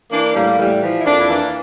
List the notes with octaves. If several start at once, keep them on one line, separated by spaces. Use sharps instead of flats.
E3 A#3 D4
A2 G3 A#3
A2 E3 G3
E3 F3
E4
F2 A#3 D4
E4
E3 A#3 D4